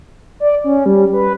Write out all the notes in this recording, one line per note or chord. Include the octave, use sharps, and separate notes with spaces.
D5
C#4
G3
B4